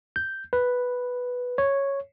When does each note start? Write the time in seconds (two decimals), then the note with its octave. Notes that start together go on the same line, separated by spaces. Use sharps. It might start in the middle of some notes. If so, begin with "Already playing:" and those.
0.16 G6
0.53 B4
1.58 C#5